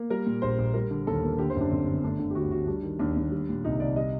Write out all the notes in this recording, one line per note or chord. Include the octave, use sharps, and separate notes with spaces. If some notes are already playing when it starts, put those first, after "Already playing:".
Already playing: A#3
G3 A#4
A#2
A#1 C5
A#1
G3 A#4
D3
D#2 A4
A#3
D3 G4
C5
F#2
D4
G1 C4
G1
A3 D4
D3
G4
D2 F#4
D2 F#4
G3 D4
D#3
D#2 D4
D#2
G3
A#2
C2 D#4
C2 D5
G3 D#5